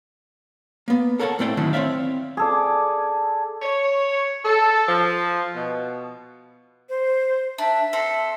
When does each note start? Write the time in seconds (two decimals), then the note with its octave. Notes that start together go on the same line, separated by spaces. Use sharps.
0.88 A#3 B3
1.20 A4 A#4 C#5 F#5 G#5 A5
1.39 A2 A3 C4 E4 D5 G5
1.57 F#2 A2 D3 D#3 A3 E4
1.73 C4 C#5 D5 E5 F5
2.37 G#4 A4 D5
3.62 C#5
4.44 A4
4.88 F3
5.55 B2
6.89 C5
7.58 D4 E5
7.93 C4 A4